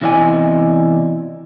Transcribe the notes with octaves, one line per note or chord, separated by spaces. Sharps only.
E2 C3 E4 D5 D#5 G#5